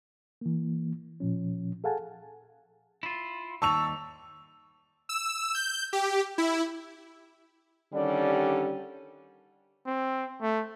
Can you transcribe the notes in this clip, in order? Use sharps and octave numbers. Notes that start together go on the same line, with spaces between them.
E3 A#3
A#2 F3 C#4
G#4 A4 F5 F#5 G#5 A5
E4 F4
D#2 D#3 G3 A5 C#6 E6 F7
E6
G6
G4
E4
D3 D#3 G3 C#4 G4 D5
C4
A3